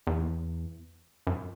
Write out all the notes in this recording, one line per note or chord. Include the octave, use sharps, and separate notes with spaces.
E2
F#2